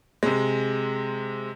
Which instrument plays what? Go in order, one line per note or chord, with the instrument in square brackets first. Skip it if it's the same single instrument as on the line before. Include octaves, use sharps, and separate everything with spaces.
[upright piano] C3 G#3